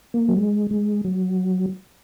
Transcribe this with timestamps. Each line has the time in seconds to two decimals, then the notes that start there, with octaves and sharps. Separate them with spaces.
0.14 A#3
0.28 F#3
0.37 G#3
0.71 G#3
1.05 F#3